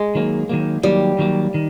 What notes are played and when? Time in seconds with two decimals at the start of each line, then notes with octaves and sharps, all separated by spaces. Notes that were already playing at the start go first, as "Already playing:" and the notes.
Already playing: G#3
0.15 D#3 F#3 A#3
0.49 D#3 F#3 A#3
0.83 D#3 F#3 G3 A#3
1.19 D#3 F#3 A#3
1.54 D#3